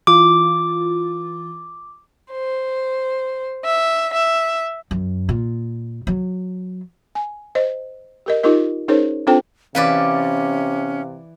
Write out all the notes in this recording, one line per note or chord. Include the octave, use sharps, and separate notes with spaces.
E3 F4 D6
C5
E5
E5
F#2
A#2
F#3
G#5
C5 D#5
G4 A#4 D#5
D#4 F4 G4 A#4 D#5
C#4 D#4 G#4 A#4 C5 C#5
C4 D4 F4 A4 C5 G5
C3 E3 C#4 B4 D5 F5 D6